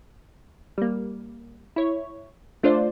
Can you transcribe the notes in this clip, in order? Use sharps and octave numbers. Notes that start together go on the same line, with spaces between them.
G3 A#3
E4 C#5
A3 D4 F4 C5 D5